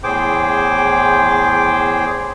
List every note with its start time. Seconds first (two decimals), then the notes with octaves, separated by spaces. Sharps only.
0.04 E2 A2 G#4 C5 G5 D6